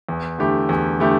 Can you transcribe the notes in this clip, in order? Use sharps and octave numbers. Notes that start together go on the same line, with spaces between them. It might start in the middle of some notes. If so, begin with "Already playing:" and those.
E2
D3 A3 E4 G4
E2
D3 A3 E4 G4